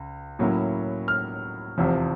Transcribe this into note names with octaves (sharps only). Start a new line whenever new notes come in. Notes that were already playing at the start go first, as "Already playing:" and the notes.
Already playing: C#2
A2 F#3 A#3 C#4 E4
F6
F1 E2 C3 F3